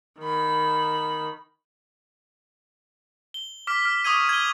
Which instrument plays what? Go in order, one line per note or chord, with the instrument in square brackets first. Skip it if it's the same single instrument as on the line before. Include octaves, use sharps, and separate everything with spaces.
[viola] D#3 B5
[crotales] G7
D6 F6 B6
F6
C#6 D#6 E6 G#6 D#7
G#6 G7